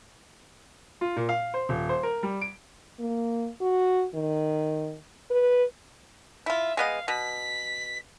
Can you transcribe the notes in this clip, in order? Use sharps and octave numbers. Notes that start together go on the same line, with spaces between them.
F4
A#2
F5
C5
D#1
C5
A#4
G3
D7
A#3
F#4
D#3
B4
E4 F4 E5
G#3 B3 D#5 F5
B2 B6